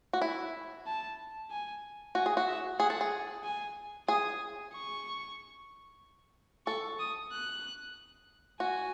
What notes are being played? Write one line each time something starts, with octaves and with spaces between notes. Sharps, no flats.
F#4
E4
A5
G#5
F#4 G#5
G#4
F#4
E5
G#4 F#5
A4
G#4
G#5
G#4 D#6
C#6
A4 C#6
D#6
F#6
F#4 G#5